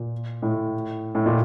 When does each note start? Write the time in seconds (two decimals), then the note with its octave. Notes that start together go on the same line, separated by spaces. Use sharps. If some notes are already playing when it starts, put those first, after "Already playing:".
Already playing: A#2
0.42 A2
1.15 A2
1.26 A#2